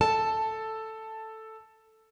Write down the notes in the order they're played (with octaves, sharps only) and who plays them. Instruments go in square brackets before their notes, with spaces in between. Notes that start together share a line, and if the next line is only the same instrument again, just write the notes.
[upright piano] A4 [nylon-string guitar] A5